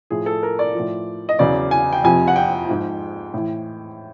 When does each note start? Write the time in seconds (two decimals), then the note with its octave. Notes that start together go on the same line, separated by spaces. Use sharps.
0.10 A2 F3 G#4
0.26 A4
0.43 A#4
0.59 D5
0.75 A2 F3
1.29 D#5
1.39 E2 C#3 F#3 D5
1.71 G#5
1.93 G5
2.04 F2 C3 F3 G#5
2.28 F#5
2.36 G5
2.69 G#2 F3
3.34 A2 E3